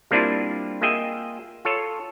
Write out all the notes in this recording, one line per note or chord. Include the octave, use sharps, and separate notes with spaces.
G3 A#3 C4 D4 E4 F4
A#3 F4 G#4 D#5 E5 G5
F4 A4 C#5